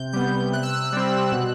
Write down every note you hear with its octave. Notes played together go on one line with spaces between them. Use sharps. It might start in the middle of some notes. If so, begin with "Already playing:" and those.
Already playing: C3 G6
G3 B3 G6
G6
C3 F#6
E6
F#6
G3 C4
B2